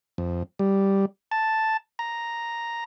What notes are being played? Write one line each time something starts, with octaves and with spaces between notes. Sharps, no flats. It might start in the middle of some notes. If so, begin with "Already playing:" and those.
F2
G3
A5
A#5